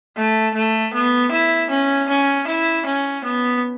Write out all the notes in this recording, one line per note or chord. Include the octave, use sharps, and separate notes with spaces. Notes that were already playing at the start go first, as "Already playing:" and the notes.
A3
A3
B3
E4
C#4
C#4
E4
C#4
B3